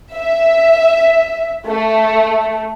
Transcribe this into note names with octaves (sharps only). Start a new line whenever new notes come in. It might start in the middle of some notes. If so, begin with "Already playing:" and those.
E5
A3